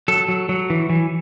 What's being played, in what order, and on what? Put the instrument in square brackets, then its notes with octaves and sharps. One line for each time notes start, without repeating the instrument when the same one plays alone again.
[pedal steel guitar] F#3 A4
F#3
F#3
E3
E3